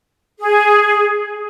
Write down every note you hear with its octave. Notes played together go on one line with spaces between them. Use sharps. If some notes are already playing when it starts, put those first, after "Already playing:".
G#4